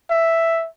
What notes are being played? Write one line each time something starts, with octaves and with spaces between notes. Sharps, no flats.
E5